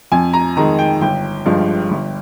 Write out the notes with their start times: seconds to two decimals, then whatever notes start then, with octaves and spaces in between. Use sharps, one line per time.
0.12 F2 G#5
0.33 A#5
0.57 D#3 G#3 A#5
0.79 G5
1.01 G1 G5
1.46 G2 F3 G#3
1.91 G1